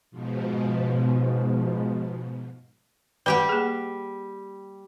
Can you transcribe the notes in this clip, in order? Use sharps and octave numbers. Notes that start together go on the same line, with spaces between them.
G#2 B2 F3
G3 G4 B4 F#5 G5
A#3 G#4